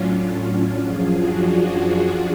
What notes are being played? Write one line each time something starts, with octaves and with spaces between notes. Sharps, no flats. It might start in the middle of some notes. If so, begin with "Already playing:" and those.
Already playing: A2 F#3 C#4 D4 F4
C#4 F4
F#2 F3 F4 G#4
D4 F#4
D4